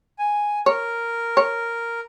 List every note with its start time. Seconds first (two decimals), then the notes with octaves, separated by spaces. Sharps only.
0.19 G#5
0.66 A#4 C#5
1.37 C#5